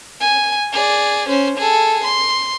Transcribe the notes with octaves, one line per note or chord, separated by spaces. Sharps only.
G#5
G#4 D5
C#4 C5
G#4 A4
C6